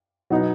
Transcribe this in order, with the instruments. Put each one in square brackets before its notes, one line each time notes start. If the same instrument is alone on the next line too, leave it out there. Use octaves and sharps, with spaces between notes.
[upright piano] B2 F#3 B3 D#4